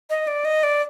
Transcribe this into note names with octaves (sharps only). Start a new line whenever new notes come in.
D#5
D5
D#5
D5